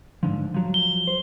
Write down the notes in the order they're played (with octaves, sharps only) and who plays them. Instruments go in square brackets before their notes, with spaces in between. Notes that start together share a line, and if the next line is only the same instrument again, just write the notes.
[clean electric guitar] G#2 D3 F3
F3 F#3
[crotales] G7
[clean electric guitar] C5